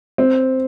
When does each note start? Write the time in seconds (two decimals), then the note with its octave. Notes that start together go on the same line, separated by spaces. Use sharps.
0.18 C4